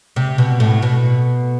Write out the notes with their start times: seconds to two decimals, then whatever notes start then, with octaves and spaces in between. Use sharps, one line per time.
0.16 C3
0.38 B2
0.60 A2
0.82 B2